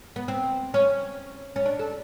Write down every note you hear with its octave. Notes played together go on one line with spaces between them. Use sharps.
B3
C4
C#4
C#4
D4
A4